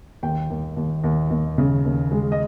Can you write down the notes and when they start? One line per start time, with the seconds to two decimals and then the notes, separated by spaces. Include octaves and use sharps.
0.23 D#2 G5
0.50 D#2
0.77 D#2
1.04 D#2
1.30 D#2
1.58 C#3
1.85 D#2
2.12 G#3
2.32 D#5